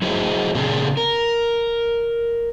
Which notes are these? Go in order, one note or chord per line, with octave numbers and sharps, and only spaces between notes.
F#3 E4 F#4 G#4 C5 D#5
A#2 C#3 C4 D4 G#4
A#4